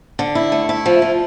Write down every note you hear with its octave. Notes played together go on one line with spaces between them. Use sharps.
D3
E4
A3
E4
F3
F3